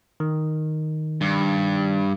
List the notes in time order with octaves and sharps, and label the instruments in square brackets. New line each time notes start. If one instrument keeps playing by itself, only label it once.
[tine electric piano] D#3
[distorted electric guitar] G2